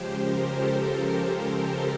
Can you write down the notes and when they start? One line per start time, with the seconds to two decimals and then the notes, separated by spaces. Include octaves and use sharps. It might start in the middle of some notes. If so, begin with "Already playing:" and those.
Already playing: C#3 F3 G#3 G4 C5
0.21 A#4
0.55 A4